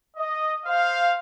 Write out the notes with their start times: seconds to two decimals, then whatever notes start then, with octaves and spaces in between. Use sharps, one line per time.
0.16 D#5
0.66 C5 F5